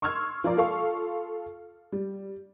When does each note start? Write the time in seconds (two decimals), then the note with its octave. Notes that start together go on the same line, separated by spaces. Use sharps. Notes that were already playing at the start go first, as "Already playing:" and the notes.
0.02 C6 C#6 E6 F6 G#6
0.44 F3 F4 A#4 D5
0.57 F4 A4 F5 C#6
1.92 G3